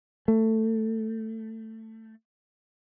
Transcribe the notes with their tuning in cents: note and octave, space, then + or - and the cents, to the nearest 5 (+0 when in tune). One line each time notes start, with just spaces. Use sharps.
A3 +15